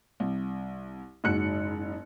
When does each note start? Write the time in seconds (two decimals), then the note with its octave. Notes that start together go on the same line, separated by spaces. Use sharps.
0.20 C2
1.24 F#1 G#2 F#4 F#6 C#7